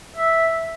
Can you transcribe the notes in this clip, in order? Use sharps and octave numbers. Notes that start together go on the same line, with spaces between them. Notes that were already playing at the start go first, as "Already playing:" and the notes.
E5